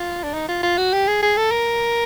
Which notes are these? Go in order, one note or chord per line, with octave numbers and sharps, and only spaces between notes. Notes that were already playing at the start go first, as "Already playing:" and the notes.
Already playing: F4
D4
D#4
F4
F4
F#4
G4
G#4
G#4
A4
A#4